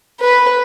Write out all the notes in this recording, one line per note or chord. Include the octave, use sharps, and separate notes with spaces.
B4